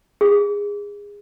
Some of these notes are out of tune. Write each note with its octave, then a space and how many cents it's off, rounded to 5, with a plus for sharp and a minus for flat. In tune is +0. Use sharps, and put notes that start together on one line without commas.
G#4 -25